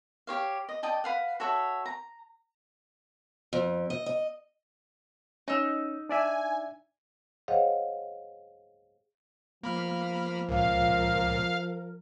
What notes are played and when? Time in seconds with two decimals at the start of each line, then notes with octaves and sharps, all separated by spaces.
0.27 G4 C#5 F5
0.69 D#5
0.83 D5 D#5 G5 A5
1.04 B4 F5 F#5
1.40 F#4 A4 C#5 E5
1.85 A#5
3.53 F2
3.90 D#5
4.06 D#5
5.48 C#4 D#4 E6
6.09 D4 D5 E5 G#5
7.48 G#4 C5 C#5 D#5 F5 F#5
9.63 F3 A#3 B5 F6
10.49 C#2 A#2 A#4 F5